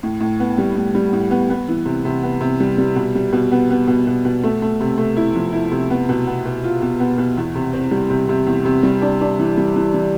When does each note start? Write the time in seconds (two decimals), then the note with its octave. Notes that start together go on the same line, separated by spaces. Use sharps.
0.03 A2
0.20 A2
0.40 B3
0.58 G3
0.75 A2
0.95 G3
1.13 A2
1.31 B3
1.50 B3
1.68 E3
1.86 C3
2.05 C3
2.23 B3
2.41 C3
2.60 G3
2.78 G3
2.96 B2
3.15 G3
3.33 B2
3.52 B3
3.70 B3
3.88 B2
4.07 B2
4.25 B2
4.43 A3
4.62 A3
4.80 C3
4.98 A3
5.17 E4
5.36 F3
5.53 E4
5.72 C3
5.90 B3
6.09 B2
6.27 B3
6.46 B2
6.64 F4
6.82 B2
7.00 B3
7.18 B2
7.37 E2
7.55 C3
7.73 C4
7.91 G3
8.10 C3
8.29 C3
8.47 E2
8.65 C3
8.83 G3
9.02 D4
9.21 D4
9.39 E3
9.57 G3
9.76 E3
9.94 E3